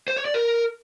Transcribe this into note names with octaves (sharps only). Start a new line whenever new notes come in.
C5
C#5
D5
A#4